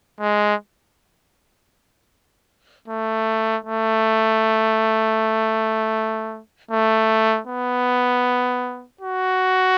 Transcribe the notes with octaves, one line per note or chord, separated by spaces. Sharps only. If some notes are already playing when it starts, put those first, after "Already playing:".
G#3
A3
A3
A3
B3
F#4